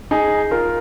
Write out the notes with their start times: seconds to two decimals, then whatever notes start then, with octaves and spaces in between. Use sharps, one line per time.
0.11 D#4 G#4
0.51 F4 A#4